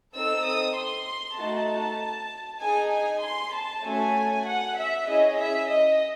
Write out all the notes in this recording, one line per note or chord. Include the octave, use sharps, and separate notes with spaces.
C4 D#4 A4 E6
D#6
C6
A3 D#4 F#4 A5
D#4 G#4 G#5
G#5
C6
A5
A3 C#4 F#4 A4 G#5
F#5
E5
C#4 E4 G#4 D#5
E5
D#5